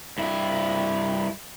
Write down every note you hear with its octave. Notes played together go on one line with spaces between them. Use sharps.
G2 E4